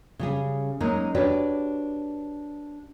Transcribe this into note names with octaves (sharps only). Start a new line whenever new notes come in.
C#3 G3 G#4
F#3 G#3 A#3 C#4 D#4
D4 F#4 G4 B4 C#5 D5